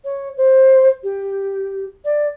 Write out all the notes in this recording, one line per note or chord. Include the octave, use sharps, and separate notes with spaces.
C#5
C5
G4
D5